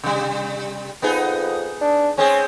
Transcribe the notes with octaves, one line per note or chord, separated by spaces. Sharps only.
C3 G3
F2 B3 D#4 G#4
D4
G#3 C4 C#4 G#4